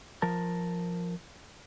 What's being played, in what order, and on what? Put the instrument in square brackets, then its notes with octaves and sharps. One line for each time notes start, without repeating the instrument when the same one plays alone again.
[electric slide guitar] F3 A#4 A5